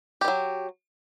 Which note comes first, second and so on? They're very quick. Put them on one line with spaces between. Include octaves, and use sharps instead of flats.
G4 D#3 F#3